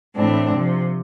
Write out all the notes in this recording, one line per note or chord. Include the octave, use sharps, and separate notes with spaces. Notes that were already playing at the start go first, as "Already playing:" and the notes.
A2 E3 C4 D4
C3 F3